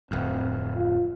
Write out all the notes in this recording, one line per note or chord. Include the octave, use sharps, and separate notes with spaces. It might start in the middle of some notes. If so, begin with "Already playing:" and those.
D1 F2 C4
F4